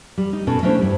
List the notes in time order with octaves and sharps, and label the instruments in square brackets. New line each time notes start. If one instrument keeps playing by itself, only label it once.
[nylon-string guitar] G3
D#4
B2 C#4 A4
A3 C#4 D4 E4 C5 C#5
G2 G3